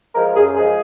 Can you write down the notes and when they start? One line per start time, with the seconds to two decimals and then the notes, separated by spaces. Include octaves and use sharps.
0.15 F3 G#3 A#4
0.35 F#2 G#4
0.56 F3 G#3 G#4